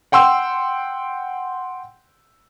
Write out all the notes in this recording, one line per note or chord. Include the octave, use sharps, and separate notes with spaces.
F#5 G5 C6 E6